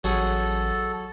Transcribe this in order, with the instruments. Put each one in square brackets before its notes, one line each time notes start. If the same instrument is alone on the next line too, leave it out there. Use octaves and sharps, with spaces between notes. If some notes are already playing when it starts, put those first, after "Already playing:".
[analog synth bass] A1 [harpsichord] F#3 G#4 F#5 [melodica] A4